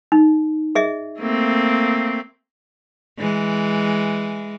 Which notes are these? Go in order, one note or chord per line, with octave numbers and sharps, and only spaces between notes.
D#4
G#4 D#5 E5
A3 A#3 C4
E3 G#3